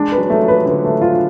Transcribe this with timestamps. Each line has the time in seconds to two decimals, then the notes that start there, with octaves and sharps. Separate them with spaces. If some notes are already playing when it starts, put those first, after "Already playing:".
Already playing: G#3 D4
0.12 B4
0.18 F#3
0.30 F#3 A3
0.42 F3
0.48 B4
0.66 D3 B4
0.84 A3
1.01 F4